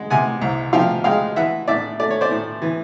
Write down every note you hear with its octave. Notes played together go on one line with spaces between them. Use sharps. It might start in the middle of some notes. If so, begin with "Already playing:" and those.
Already playing: G#3 F#5
C3 F#5 G#5
C2
F3 F5 G5
G#3 F5 G5
E3 E5 F#5
A2 D5 E5
A3 D5
C#5
C5 D5
A2
E3